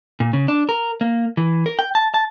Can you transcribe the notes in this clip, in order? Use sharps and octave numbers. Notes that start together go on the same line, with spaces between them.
A#2
C#3
D4
A#4
A#3
E3
A#4
G5
A5
A5